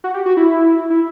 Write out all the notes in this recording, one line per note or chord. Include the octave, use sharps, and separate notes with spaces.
F#4
G4
F#4
E4
E4